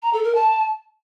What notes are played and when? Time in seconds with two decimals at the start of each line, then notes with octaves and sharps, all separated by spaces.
0.02 A#5
0.13 A4
0.24 A#4
0.34 A5